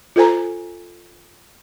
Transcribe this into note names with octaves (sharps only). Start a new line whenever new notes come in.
F4 A4 C5 G#5 A#5